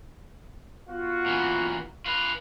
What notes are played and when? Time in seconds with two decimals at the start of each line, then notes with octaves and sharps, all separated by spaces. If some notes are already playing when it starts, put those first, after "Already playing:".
0.89 B3 F4 F#4
1.26 A#2 E3
2.06 F4 B4